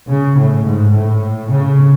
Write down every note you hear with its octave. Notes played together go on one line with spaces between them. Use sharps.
C#3
A2
G#2
A2
C#3